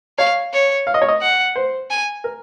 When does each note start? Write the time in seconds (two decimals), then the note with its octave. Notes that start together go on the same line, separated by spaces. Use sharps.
0.18 C#5 F5
0.53 C#5
0.87 F5
0.94 D#5
1.02 C#5
1.08 D#5
1.22 F#5
1.56 C5
1.90 G#5
2.24 A#4